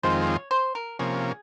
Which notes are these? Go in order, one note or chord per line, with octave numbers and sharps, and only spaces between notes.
F2 D#3 G#3 C4 F4 C5
C#5
C5
A#4
C3 F3 A#3 C#4 G#4